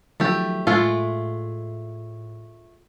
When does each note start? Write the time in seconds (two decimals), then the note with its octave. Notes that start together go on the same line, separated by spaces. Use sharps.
0.20 D#3 F3 F#3 A3 G4
0.67 A2 G#3 A3 F4